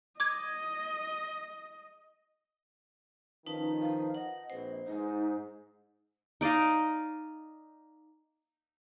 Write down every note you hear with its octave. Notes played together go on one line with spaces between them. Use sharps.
D#5 D6 G#6
D#3 F3 C#4 D#4 B4 A5
F5
D#5 F#5
A#1 C4 B4 C5
G#2 D#4
D#4 D5 D#5 F5